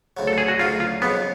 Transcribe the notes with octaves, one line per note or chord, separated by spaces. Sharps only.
D2 C#3 F#3
A4
G#4
F#4
D2 C#3 F#3 F4
F4
F2 C#3 F#3 B3 C#4